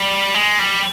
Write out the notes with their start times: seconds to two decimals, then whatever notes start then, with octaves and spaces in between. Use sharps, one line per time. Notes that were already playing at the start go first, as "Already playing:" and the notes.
Already playing: G3
0.34 G#3
0.59 G3